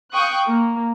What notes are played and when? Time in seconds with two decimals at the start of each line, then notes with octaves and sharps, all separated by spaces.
0.13 F5 G5 C#6 D#6 F#6
0.49 A#3